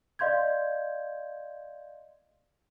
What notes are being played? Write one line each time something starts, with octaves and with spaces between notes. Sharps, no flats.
D5 D#5 F5 C6 G6 G#6